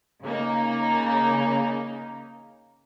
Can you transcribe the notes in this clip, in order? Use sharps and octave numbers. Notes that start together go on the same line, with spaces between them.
C#3 A#3 D#4